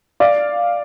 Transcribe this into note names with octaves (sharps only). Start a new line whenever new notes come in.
D5 F5